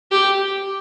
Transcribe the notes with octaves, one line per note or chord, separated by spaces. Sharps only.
G4